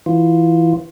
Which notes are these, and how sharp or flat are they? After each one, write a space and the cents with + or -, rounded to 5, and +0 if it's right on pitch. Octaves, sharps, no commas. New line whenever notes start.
E3 +0 F4 +5